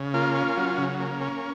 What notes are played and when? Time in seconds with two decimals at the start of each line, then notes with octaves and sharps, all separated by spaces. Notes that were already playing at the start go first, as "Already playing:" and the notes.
Already playing: C#3
0.14 A#3 F4
0.35 C#4
0.57 F#3
0.78 C#3
1.00 A#3
1.21 C#4